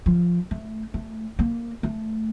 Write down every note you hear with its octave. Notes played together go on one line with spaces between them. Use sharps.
F3
A3
A3
A#3
A3